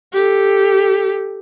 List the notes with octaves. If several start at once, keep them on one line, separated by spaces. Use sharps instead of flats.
G4 A4